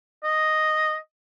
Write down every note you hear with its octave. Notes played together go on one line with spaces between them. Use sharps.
D#5